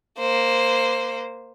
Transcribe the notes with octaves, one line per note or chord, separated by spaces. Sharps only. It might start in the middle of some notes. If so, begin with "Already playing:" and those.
A#3 C5